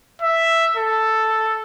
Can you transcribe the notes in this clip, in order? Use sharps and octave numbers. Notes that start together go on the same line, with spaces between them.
E5
A4